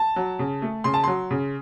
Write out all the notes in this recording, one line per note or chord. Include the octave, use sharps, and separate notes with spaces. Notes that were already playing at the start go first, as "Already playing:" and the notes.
Already playing: A5
F#3
C#3
A3
C#3 C6
A5
F#3 C6
C#3